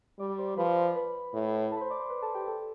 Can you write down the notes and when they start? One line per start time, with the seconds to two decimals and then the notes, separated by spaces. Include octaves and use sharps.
0.19 G3 D5 D6
0.38 C5 C6
0.57 F3 B4 B5
0.95 B4 B5
1.34 A2
1.71 A4 A5
1.77 B5
1.81 C5 C6
1.90 D5 D6
2.00 C5 C6
2.10 B4 B5
2.22 A4 A5
2.35 G4 G5
2.48 A4 A5